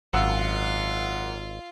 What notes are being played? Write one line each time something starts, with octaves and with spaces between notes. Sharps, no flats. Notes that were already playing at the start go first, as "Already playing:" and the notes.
G#1 F#2 F4 F5 F#5 E6